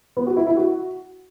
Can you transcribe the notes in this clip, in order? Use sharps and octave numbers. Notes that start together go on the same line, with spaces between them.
B3
F#4
E4
E4
F#4